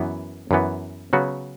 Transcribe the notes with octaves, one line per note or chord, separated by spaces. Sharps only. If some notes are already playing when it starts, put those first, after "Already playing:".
Already playing: F#2 E3 B3
F#2 E3 B3
C#3 F#3 B3 F#4